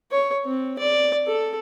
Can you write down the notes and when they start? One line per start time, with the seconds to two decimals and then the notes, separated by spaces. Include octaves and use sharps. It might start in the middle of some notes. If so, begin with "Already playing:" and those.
0.12 C#5
0.45 C4
0.79 D5
1.27 A4